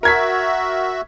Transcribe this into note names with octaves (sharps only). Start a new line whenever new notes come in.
F#4 A#4 E5 G#6 B6